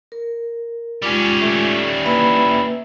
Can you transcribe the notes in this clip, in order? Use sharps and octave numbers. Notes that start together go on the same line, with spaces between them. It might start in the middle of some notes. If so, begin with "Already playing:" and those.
A#4
G3 G#3 C#4 F4 D6
A3
A#3 E4 B4 E5